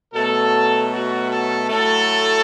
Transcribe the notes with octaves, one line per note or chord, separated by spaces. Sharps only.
B2 F#3 A3 A4
F#4
A4
A2 F#3 A3 A4